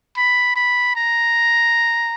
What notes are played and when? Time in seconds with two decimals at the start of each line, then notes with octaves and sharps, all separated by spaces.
0.17 B5
0.56 B5
0.96 A#5